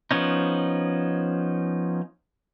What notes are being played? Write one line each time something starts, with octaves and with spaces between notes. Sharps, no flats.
F3 B3 C#4 D#4